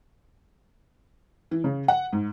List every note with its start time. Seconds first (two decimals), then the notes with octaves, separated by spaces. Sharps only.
1.51 E3
1.64 C#3
1.88 F#5
2.13 G#2